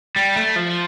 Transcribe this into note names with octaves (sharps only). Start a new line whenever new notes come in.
G3
A3
F3